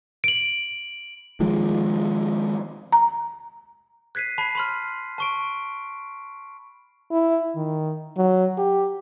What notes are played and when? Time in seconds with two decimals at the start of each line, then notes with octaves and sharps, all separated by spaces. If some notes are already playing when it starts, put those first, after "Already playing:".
0.24 D7 F#7
1.40 D#3 F3 G#3
2.92 A#5
4.15 F#6 G#6 B6 C7 D#7
4.38 A5 B5 C7
4.55 B5 C6 F6
5.18 A5 C#6 D7
7.11 E4
7.56 D#3
8.17 F#3
8.58 G4